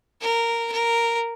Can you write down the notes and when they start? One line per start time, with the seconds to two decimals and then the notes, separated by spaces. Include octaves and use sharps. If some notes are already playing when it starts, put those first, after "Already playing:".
0.21 A#4
0.72 A#4